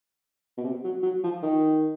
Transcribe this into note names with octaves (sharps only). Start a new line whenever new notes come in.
B2
C3
F#3
F#3
F3
D#3